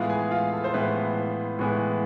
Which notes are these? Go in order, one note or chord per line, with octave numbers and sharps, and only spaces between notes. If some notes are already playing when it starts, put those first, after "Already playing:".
Already playing: A2 E3 G#3 B3 F4 F5
G#4 G#5
F4 F5
A4
C5
A2 E3 G#3 B3 B4
A2 E3 G#3 B3